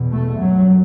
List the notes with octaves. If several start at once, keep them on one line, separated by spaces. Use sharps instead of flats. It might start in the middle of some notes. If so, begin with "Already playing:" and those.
Already playing: E2 B2
A3
F#2 F#3